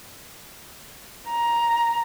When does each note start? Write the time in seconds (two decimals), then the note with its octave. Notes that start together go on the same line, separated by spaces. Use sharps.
1.28 A#5